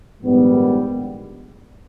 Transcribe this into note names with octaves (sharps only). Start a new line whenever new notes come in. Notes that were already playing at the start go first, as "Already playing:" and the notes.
A#1 G#2 D#3 G3 B3